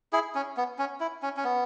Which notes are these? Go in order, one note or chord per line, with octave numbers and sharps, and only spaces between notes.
E4 G#4
C#4
B3
C#4
E4
C#4
C#4
B3